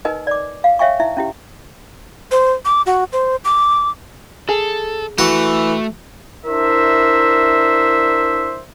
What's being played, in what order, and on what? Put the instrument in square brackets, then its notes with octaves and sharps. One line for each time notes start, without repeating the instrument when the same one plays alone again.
[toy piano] D#4 A#4 B4 D#5 G#5
D5 D6
F5
C#5 E5 F5 G5 G#5 C#6
D#4 E4 E5
C#4 E4 G4
[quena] C5
D6
F#4
C5
D6
[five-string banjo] G#4 [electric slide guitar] A4
[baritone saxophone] E3 [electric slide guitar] A3 [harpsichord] F#4
[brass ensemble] D4 E4 A#4 C5 E5